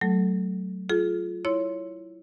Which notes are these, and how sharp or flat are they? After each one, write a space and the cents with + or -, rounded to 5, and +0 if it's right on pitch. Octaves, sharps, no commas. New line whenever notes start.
F#3 +20 A3 +0 A4 +0
F4 +0 G#4 +40
E4 +0 C#5 +5 C6 +0